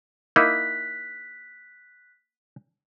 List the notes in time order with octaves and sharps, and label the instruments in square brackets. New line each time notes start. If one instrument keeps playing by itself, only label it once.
[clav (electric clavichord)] A#3 D#4 E4 [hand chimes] F#6 B6